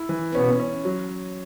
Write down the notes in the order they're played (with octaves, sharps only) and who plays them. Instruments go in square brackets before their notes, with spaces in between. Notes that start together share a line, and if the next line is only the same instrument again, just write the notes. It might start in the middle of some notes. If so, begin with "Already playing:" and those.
Already playing: [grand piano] E4
E3
[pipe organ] B2 B3 [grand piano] C#4
[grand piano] C#4
F#3